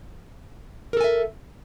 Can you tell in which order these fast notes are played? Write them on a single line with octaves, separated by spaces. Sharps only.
A#4 A4 G#5 E5